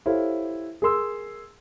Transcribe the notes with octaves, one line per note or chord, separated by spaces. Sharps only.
E4 G4 A4 C5 C#5 F5
G#4 A#4 C6 E6